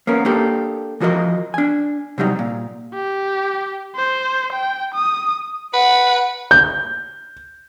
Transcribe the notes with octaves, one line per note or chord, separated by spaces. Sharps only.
A#3 B3 C#4 A#4
A#3 D4 G4 A4
E3 F3 F#4 A#4 D#5
D4 G#5
C3 F#3 G3 D#4
A#2
G4
C5
G5
D#6
B4 F#5
G6